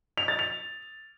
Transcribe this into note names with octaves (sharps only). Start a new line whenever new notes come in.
F7
A6
F7